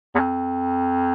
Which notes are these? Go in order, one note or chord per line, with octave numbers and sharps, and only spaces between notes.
E2
F2